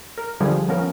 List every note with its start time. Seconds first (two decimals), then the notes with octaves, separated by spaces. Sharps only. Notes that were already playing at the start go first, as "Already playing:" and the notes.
0.18 A#4
0.40 D3 F3 G3 G#4
0.69 F3 B3 C#4 A#4